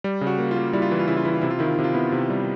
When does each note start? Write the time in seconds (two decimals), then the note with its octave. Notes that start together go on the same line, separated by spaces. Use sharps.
0.04 G3
0.21 C#3
0.27 F#4
0.39 A#3
0.51 A#3 F4
0.73 G3 E4
0.82 F4
0.91 E3 E4
0.99 F4
1.08 C#3 E4
1.17 F4
1.25 E3 E4
1.34 F4
1.41 C3 E4
1.50 F4
1.59 D#3 E4
1.67 F4
1.75 C3 E4
1.84 F4
1.93 B3 E4
2.12 C3 E4
2.30 G3